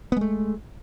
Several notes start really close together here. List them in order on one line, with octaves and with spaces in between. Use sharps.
B3 G#3 A3